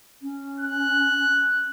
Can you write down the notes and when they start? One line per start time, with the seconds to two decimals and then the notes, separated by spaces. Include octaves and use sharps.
0.22 C#4
0.60 F#6